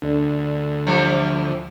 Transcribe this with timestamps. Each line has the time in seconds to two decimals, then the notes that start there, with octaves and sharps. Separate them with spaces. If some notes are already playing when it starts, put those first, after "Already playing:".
0.02 D2 D4 A4 D5
0.87 E3 F3 G3